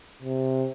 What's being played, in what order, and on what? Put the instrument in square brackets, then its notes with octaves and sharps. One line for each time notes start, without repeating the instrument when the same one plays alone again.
[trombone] C3